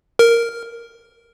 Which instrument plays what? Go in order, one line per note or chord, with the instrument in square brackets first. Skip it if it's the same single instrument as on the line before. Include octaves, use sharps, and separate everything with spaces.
[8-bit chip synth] A#4